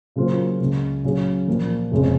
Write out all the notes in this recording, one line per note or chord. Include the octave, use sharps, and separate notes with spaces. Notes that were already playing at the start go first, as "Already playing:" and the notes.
C#3 F#3 A#3 F4 C5
C#2 C#3 G#3
C#3 F#3 C#4 G#4
A#2 F3 A#3
F1 F2 C#3 G#3 C#4